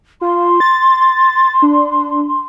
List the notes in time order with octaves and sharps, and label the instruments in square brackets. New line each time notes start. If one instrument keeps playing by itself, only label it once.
[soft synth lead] F4 [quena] C6
[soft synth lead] A6
D4